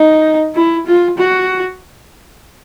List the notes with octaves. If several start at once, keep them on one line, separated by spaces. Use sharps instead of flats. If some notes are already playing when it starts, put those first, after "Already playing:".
Already playing: D#4
E4
F4
F#4